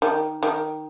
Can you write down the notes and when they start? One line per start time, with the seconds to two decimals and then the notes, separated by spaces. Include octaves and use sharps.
0.02 D#3
0.43 D#3